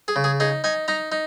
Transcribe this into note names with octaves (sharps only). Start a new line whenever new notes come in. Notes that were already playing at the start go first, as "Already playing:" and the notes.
G#4
C#3
G#4
D#4 G#4
D#4 G#5
D#4 A#5
D#4